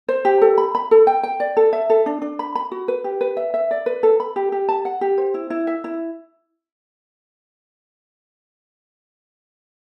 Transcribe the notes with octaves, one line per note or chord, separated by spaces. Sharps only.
C5
G4
A4
B5
B5
A4
G5
G5
D5
A4
E5
A4
D4
D4
B5
B5
F#4
B4
G4
B4
E5
E5
D5
B4
A4
B5
G4
G4
A5
F#5
G4
C5
E4
E4
E5
E4